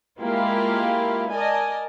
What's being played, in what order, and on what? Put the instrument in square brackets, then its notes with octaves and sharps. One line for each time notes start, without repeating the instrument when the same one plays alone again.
[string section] G#3 A#3 E4 F4 G4 F5
A#4 D5 D#5 G#5 A5